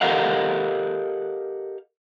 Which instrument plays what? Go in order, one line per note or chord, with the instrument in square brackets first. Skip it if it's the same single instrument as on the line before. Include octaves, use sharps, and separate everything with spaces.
[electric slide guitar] G4 A4 A#4 D#5 F5 F#5